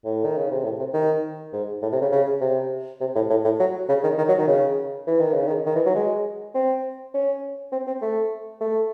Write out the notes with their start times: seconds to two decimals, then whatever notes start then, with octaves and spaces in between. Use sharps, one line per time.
0.05 A2
0.25 D#3
0.37 C#3
0.51 C3
0.64 A2
0.79 C3
0.94 D#3
1.53 G#2
1.82 A2
1.92 C3
2.02 C#3
2.12 C#3
2.41 C3
3.01 C3
3.15 A2
3.30 A2
3.44 A2
3.60 F#3
3.89 C#3
4.04 D#3
4.18 D#3
4.28 F#3
4.38 D#3
4.48 C#3
5.07 E3
5.20 D#3
5.34 C#3
5.48 D#3
5.66 D#3
5.76 E3
5.86 F#3
5.95 G#3
6.55 C4
7.14 C#4
7.72 C4
7.87 C4
8.02 A3
8.61 A3